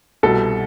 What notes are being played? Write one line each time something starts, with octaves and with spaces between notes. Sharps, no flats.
C2 B2 A4